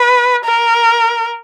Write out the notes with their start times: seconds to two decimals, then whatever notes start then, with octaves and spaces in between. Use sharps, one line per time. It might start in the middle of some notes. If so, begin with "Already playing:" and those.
Already playing: B4
0.45 A#4